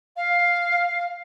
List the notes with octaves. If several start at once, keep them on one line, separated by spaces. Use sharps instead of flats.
F5